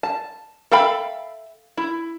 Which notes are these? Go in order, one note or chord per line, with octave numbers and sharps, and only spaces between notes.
A5
A4 E5 F5 G5 B5
E4